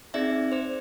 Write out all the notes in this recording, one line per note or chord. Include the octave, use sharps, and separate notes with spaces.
C4 D#4 G#4 D5 E5
C5 D5